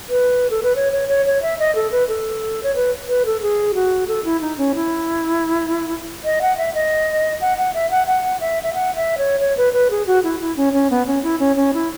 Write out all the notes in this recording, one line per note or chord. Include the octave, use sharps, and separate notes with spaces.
B4
A4
B4
C#5
C#5
C#5
C#5
E5
D#5
A4
B4
A4
C#5
B4
B4
A4
G#4
F#4
A4
E4
D#4
C#4
E4
D#5
F#5
E5
D#5
F#5
F#5
E5
F#5
F#5
E5
E5
F#5
E5
C#5
C#5
B4
B4
G#4
F#4
E4
E4
C#4
C#4
B3
C#4
E4
C#4
C#4
E4